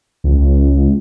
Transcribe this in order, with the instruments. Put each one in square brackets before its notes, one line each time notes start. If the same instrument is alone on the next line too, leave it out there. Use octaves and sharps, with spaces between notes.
[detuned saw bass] C#2